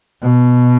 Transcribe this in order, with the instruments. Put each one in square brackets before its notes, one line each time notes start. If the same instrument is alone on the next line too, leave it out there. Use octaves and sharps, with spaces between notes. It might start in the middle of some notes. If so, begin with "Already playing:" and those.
[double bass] B2